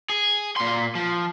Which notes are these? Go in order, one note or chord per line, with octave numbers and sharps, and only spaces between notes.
G#4
A#2 C6
F3